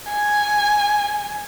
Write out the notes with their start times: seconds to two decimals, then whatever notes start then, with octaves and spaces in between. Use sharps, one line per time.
0.09 G#5